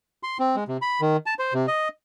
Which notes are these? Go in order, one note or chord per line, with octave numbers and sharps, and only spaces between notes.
C6
C4
G#3
C3
B5
D#3
A5
C5
C3
D#5